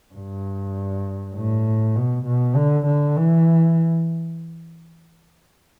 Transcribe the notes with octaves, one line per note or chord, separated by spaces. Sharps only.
G2
A2
B2
B2
D3
D3
E3